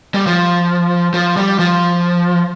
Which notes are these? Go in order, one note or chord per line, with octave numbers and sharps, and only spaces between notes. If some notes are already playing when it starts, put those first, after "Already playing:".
G3
F3
F3
G3
F3